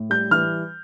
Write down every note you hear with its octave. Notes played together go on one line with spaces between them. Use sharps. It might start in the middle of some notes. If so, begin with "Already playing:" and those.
Already playing: A2
G3 G6
E3 F6